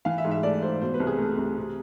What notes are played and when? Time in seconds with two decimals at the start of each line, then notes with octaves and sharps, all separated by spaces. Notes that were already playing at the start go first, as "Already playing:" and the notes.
0.05 E3 F5
0.18 E5
0.25 G#2
0.31 E5
0.43 A3 D5
0.62 G#2 C5
0.81 B2 C5
0.94 B4
1.00 C2
1.07 G#4
1.19 A3
1.38 C2
1.57 C3